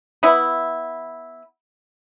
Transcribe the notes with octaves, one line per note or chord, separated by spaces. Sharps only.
B3 E4